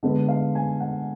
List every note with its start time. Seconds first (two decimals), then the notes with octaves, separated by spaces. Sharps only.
0.03 D3 G#3 B3
0.28 F5
0.55 G#5
0.80 F#5